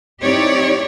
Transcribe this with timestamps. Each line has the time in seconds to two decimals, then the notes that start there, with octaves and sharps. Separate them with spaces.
0.21 C4 D#4 E4 G4 C#5 D5